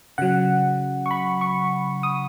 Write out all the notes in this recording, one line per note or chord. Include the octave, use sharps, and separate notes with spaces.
C#3 F#3 F#5
C#6
B5
C#6
D#6